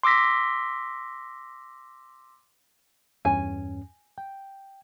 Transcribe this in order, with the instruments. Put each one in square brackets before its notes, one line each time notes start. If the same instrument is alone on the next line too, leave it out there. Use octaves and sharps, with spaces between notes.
[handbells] C6 D6 E6 A#6 B6
[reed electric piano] E2 G2 C#4 [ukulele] G#5
[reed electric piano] G5